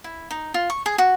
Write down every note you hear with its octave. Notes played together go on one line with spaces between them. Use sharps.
E4
D#4
F4
C#6
G#4
F#4